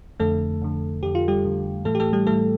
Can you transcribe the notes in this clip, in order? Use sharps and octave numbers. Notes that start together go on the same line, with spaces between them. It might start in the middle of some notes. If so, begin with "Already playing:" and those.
F2 D3 A3 A4
F2 D3
F2 D3 G4
F4
G3 G4
F2 D3
A2 E3 A3 A4
G4
A3 A4
G3 G4
A2 E3 A3 A4